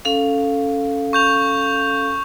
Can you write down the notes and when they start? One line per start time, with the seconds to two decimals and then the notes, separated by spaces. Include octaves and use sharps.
0.05 C#4 A4 F5
1.13 C#6 G6 F7